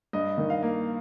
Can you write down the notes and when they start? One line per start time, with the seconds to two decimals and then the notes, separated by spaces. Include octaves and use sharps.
0.13 G2 D#5
0.38 D#3
0.50 F5
0.62 A#3